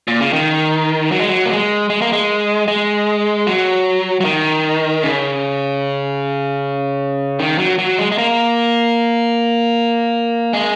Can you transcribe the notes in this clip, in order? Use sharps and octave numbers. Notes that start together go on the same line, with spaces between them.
A#2
C#3
D#3
F#3
G#3
F#3
A#3
G#3
G#3
A#3
G#3
G#3
F#3
F#3
D#3
C#3
D#3
F#3
F#3
G#3
G#3
A#3
G#3